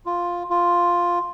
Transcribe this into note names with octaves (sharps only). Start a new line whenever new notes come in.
F4
F4